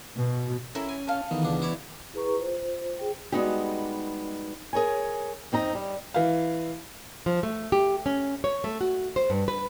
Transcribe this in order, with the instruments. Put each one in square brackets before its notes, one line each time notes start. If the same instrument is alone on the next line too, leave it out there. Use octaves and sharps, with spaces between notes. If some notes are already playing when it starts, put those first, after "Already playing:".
[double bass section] B2
[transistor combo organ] C#4 [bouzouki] E4 A#4 [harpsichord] A4
[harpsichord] G#5
[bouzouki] A4 F5
[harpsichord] D#3 [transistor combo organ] E3 B3
[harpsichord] C#2 D4
E4 C#5 D5
[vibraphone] E4 G#4 B4 A#5 C#6
F4 C5
G#4 G5
[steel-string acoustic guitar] G3 G#3 B3 D#4 F#4 G4
G#4 A#4 C#5 G#5
F2 C4 D#4 A#5
G3
[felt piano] E3 F5
[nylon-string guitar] F3
A3
G4
C#4
C#5
A3
F#4
C5
G2
B4